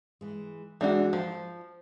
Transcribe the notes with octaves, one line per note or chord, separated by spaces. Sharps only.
E3 G#3
E3 G#3 D4 F#4
F3 C5